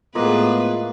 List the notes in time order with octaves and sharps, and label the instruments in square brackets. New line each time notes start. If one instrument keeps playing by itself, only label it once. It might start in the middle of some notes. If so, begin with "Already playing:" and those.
[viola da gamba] A2 G#4 B4 [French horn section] G#3 B3 [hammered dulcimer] A#3 [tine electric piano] F4 D#5